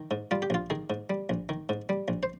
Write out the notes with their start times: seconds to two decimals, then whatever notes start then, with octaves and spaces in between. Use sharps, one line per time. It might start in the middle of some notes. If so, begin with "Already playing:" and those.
Already playing: D#3
0.11 G#2
0.31 G3 F4
0.42 G4
0.50 A#1 F4
0.70 D#3 G#4
0.90 G#2
1.10 G3
1.29 A#1
1.49 D#3
1.69 G#2
1.89 G3
2.08 A#1
2.23 C5